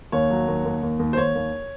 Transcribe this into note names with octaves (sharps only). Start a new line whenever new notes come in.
D#2 C#5
F#3
D#2
D#2
D#2
D#2
C5
D#2 C#5
D#2